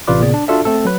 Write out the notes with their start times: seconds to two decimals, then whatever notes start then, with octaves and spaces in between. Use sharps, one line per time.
0.07 A1 C3 F4 B4 D5 D6
0.21 A#2 C#3 B3 G#4 D5
0.34 D4
0.48 D4 F4 F#4 A4 D5 E5
0.65 A3 C4 A4
0.85 F#3 B4